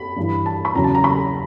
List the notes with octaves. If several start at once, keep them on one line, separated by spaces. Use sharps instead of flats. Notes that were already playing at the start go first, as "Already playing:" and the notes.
Already playing: B5
G2 E3
A5
B5
E2 C#3 F#3 A#5
A5
A#5
B5